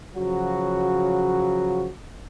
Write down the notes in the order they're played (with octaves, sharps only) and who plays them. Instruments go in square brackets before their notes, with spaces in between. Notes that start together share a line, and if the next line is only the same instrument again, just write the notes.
[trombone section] C#3 F3 F#3 F#4